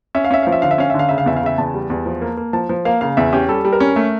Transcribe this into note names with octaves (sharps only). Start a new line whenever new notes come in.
C#4 E5
F5
C#4 E5
F3 F5
E5
D3 F5
E5
C#4 F5
D3 E5
F5
C#3 E5
F5
E2 E5
F5
C#3 E5
E2 A5
G3
E2
F3
A#3
A#3
F3 A5
F3
A#3 F5
C#3 F5
E2 E5
C#4 G4
G3 A4
G3
A#4
C#4
A3